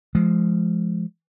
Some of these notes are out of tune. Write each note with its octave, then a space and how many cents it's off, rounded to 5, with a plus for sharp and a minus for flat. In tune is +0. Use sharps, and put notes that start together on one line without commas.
F3 -15 G#3 +20